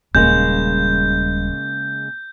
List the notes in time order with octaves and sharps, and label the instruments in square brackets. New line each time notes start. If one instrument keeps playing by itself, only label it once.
[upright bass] D#1 G3 [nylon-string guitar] C#3 G#3 A#3 [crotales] G6